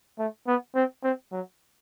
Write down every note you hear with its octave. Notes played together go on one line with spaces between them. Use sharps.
A3
B3
C4
C4
F#3